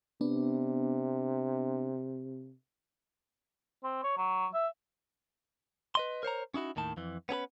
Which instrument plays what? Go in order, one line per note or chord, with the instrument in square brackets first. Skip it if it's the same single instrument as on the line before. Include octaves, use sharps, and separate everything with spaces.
[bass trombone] C3 [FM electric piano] B3 D4
[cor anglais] C4
C#5
F#3
E5
[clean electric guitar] B4 D#5 C6
A#4 C5 C#5 A#5
C#4 D#4 E4 F#4
D#2 A2 D#3 A5
F2 E3
B3 C#4 G#4 B4